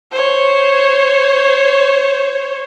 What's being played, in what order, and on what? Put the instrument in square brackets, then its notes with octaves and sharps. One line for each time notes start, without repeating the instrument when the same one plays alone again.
[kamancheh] C5 C#5